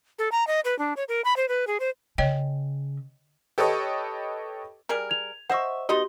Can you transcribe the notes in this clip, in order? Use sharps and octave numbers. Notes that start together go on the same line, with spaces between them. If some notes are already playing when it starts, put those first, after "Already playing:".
A4
A#5
D#5
B4
D4
C#5
A#4
B5
C5
B4
G#4
C5
C#3 C#5 D#5 G5
G4 A4 B4 C#5 D#5
G3 G#4 A#4
G#6 F7
C5 D#5 E5 F#5 C#6
B3 D#4 F#4 G4 D#5 C6